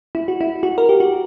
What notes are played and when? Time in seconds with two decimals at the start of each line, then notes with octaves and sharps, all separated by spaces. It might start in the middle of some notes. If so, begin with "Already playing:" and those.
0.15 E4
0.28 F#4
0.41 E4
0.63 F#4
0.78 A#4
0.89 G4
1.00 F#4